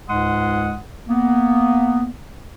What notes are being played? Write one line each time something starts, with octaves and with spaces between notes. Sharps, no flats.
C#2 G#2 G#3 F#5 C6 D#6
A#3 B3